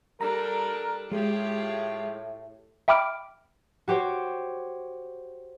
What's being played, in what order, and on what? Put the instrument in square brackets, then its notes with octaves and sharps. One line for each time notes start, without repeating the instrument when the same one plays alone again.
[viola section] G3 D4 A4 [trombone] A#4 [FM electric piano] A#5
[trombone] A2 [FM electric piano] G#3 [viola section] F4 G4 G#4
[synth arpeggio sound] E5 G5 B5 D6 F6 D7
[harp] F#4 G4 C5 C#5